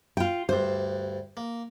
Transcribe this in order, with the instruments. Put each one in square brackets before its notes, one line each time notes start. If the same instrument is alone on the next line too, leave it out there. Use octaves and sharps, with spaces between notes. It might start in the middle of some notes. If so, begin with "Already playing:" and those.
[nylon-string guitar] F4 G5
[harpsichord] D2 G2 [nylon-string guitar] C5
[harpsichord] A#3